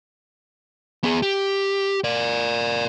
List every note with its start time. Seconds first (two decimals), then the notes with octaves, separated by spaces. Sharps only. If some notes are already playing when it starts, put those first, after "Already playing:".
1.04 B3 G#4
1.22 G4
2.04 A#4 D5